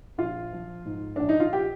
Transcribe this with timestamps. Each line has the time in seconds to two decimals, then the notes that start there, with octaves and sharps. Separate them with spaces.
0.18 A#1 F4
0.53 F3
0.85 G#2
1.16 A#1 D4
1.29 D#4
1.40 F4
1.53 G4